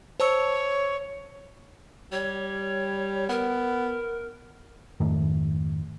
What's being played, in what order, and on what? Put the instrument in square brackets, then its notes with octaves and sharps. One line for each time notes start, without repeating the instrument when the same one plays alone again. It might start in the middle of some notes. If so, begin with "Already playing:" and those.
[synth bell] C5 A5 E6 [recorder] C#5
[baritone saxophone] G3 [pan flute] C#5
[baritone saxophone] B3 [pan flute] A#4
[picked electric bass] F2 G#2 D#3 A3